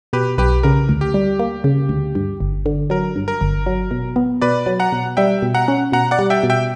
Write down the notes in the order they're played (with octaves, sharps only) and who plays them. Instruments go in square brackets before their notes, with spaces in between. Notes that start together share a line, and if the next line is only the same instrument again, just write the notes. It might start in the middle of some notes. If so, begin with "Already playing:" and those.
[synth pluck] B2 [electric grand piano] G4 B4
[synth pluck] B1 [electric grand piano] G4 B4
[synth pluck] C#3 [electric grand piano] A#4
[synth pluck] D2
[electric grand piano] G4
[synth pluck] G3
A#3
C#3
D2
G2
G1
D3
[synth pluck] F#3 [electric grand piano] A#4
[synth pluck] G2
[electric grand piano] A#4
[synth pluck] G1
F#3
B2
B3
[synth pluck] B2 [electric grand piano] B4 D5
[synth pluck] F#3
[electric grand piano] F#5 A#5
[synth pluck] B2
[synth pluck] G3 [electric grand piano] E5 G5
[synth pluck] B2
[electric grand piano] F#5 A#5
[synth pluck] C#4
[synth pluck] B2 [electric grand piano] F#5 A#5
[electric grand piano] D5 F#5
[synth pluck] G3
[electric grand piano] E5 G5
[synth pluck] B2
[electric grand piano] E5 G5